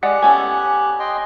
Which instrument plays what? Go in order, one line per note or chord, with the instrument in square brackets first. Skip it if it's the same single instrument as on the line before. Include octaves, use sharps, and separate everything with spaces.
[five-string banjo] G#3 [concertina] G4 F#6 [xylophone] D5 F#5
[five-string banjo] B3 C#4 A4 [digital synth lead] G#5
[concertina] D#5 G5 C6